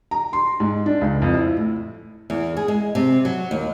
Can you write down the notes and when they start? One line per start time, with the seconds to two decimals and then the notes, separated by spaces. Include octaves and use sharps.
0.11 A#5
0.33 C6
0.60 G#2
0.86 D4
1.01 C#2
1.22 F2
1.34 E4
1.57 A2
2.30 E2
2.57 G#4
2.68 G#3
2.95 C3
3.25 F#3
3.51 D#2